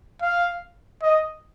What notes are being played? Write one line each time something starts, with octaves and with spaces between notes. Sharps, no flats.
F5
D#5